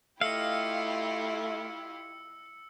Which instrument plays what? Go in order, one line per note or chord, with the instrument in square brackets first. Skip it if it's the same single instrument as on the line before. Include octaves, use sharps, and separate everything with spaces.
[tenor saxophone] A3 [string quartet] E4 F4 G4 [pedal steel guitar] D#5 F5 [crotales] E6 C#7